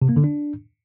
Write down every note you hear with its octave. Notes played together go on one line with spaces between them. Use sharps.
C3
A#3
D3
D4